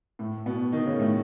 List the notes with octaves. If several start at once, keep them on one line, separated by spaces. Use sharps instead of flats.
A2 A3
B2 B3
D#3 D#4
C#3 C#4
A2 A3